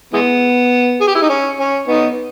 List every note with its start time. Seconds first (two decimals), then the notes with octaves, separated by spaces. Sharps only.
0.13 E3 G#3 B3
1.01 G#4
1.07 G4
1.15 E4
1.22 D#4
1.29 C#4
1.59 C#4
1.87 B3 D#4